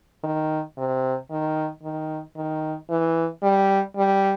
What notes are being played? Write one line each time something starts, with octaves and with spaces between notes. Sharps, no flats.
D#3
C3
D#3
D#3
D#3
E3
G3
G3